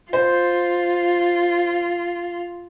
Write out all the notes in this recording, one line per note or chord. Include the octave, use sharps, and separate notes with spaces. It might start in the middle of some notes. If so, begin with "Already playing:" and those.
F4 C5